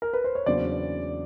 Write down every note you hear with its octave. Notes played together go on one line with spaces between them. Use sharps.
A#4
B4
C5
C#5
E2 C#3 F#3 A#3 D4 C5 D5